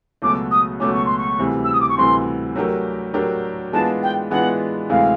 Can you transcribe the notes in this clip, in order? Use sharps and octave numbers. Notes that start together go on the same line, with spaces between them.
C#2 B2 F#3 A3 C#4 D6
D#6
C#2 B2 F#3 A3 C#4 D6
C#6
C6
C#6
D2 C3 E3 G3
E6
D#6
D6
C#6
D2 C3 E3 G3 C6
F#3 A3 D4 G4 A#4
F#3 A3 D4 G4 A#4
E3 G#3 B3 D4 F4 A5
G5
E3 G#3 B3 D4 F4 F#5
D2 C3 E3 G#3 F5